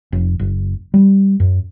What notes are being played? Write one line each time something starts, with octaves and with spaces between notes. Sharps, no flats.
F1
F#1
G3
F#2